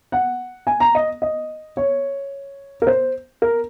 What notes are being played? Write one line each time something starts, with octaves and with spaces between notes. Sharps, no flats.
F#5
G#5
A#5
D#5
D#5
C#5
A#4
C5
A#4